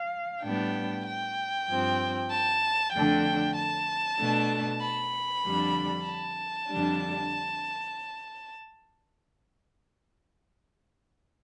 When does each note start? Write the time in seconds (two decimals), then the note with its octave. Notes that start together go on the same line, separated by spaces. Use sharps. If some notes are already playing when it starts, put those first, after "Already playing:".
Already playing: F5
0.43 A2 G3 B3 D4 G5
1.06 G5
1.69 G2 F3 C4
2.31 A5
2.93 F2 D3 A3 D4 G5
3.56 A5
4.19 B2 A3 D4
4.81 B5
5.45 F2 D3 G3 D4
6.06 A5
6.69 F2 D3 G3 D4